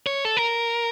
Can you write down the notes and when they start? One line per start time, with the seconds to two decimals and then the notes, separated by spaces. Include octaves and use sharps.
0.07 C#5
0.25 A4
0.37 A#4